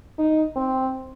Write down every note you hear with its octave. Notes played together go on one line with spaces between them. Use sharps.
D#4
C4